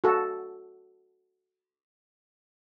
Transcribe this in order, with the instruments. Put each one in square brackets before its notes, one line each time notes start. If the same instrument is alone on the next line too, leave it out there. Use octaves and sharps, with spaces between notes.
[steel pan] F#4 A4